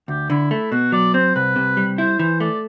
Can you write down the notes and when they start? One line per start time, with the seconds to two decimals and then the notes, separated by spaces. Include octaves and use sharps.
0.08 D2 G4
0.30 D3 E4
0.51 A3 E4
0.71 B2 F#4
0.92 F#3 D5
1.14 C4 C5
1.35 C2 B4
1.56 C3
1.77 G3
1.98 E4 C5
2.19 E3 C5
2.40 A3 D5